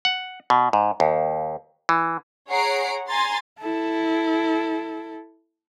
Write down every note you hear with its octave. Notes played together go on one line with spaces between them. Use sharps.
F#5
B2
G#2
D#2
E3
G#4 C#5 F#5 A#5 C7 D7
G#5 A#5 C6 A6
E4 A4